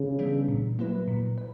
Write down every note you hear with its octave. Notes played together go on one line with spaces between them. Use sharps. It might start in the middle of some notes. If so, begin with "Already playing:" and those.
Already playing: C#3
E3 G3 B3 D4
A#2
F#3 A#3 E4 B4
A#2
B4